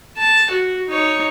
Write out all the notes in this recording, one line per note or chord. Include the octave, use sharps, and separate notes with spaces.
A5
F#4
D#4 C#5